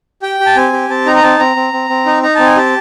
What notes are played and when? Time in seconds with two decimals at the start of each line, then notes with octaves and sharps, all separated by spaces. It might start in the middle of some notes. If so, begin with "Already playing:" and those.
0.22 G4 G5
0.40 G4
0.46 A5
0.56 C4 G#5
0.72 G4
0.90 C4 A5
1.06 D#4 A#5
1.16 A#5
1.23 C4 A5
1.39 C4 A#5
1.56 C4
1.73 C4
1.90 C4
2.06 D#4
2.23 D#4 A#5
2.35 C4 A5
2.46 G#5
2.56 G4 A5